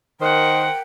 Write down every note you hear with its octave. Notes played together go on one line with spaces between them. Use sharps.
D#3 A#4 C5 F#5 G5